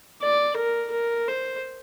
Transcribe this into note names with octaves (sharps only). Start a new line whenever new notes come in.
D5
A#4
A#4
C5